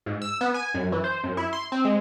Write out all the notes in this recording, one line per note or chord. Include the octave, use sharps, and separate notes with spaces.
G#2
E6
B3
G#5
F#2
E3
C5
F#2
E4
C6
C4
G#3